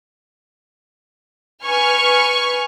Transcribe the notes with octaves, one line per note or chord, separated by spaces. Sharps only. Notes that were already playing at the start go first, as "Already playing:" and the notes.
B4 G#5 C#6 F6